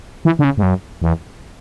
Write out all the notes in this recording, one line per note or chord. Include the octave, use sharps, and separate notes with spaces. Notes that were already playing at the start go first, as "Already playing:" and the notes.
E3
D3
C#3
G#2
F#2
E2